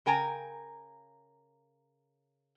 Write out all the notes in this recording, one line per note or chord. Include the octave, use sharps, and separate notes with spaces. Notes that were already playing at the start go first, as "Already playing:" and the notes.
C#3 A#4 G5 G#5 A#5